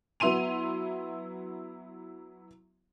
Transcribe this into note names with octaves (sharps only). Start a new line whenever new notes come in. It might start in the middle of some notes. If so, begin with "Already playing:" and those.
F#3 B3 E4 C6 D#7 F7